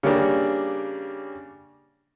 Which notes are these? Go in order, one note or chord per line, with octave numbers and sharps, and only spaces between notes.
C#3 G3 A#3 D4